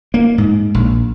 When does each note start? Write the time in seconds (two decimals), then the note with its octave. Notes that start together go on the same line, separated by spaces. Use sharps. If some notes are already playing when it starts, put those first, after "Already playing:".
0.14 A#3
0.38 G#2
0.74 A#1